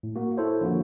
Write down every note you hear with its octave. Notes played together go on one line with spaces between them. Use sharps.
A2
A#3 F#4
E4 A4 C5 C#5
D3 F3 A#3 F4 F#4